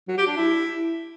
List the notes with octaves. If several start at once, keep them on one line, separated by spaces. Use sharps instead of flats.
F#3
G4
D4
E4